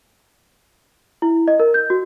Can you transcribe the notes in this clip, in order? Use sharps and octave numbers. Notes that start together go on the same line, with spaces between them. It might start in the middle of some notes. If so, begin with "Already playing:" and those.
E4
D#5
A#4
G6
F#4